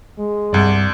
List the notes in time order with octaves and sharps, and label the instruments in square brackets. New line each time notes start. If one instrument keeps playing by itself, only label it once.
[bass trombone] G#3
[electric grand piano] C2 D5 [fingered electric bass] G2